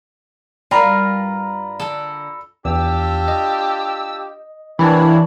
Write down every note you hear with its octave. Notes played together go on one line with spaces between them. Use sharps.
G2 G3 F4 F#4 A#4 D5 A#5 B5
D3 D4 A4
E2 D4 F4 G4 E6
D#5
C3 E3 A#3 D4 E4 C#5